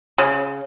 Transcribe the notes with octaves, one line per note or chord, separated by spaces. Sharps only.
C#3